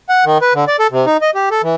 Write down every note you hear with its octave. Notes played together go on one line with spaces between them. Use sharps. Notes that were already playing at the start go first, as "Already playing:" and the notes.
F#5
D#3
B4
D3
D5
A4
C3
D#4
D#5
G4
A4
E3